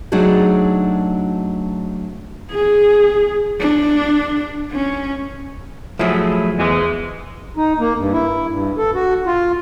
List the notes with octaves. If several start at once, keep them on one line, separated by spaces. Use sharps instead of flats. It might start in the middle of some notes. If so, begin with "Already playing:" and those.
F#3 A3 D4 D#4 F#4 G#4
G#4
D4
C#4
F3 F#3 A3 E4 G#4
E2 G#2 E3 G#3
D#4
A#3
G2
E4
G2
A4
F#4
F4